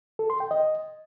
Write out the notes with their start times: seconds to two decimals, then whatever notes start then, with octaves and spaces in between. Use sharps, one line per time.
0.19 A4
0.30 C6
0.40 G5
0.51 D#5